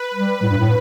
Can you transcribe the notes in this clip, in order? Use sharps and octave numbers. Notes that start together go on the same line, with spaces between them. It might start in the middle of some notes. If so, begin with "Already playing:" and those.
Already playing: B4
G3
A2
G2
A2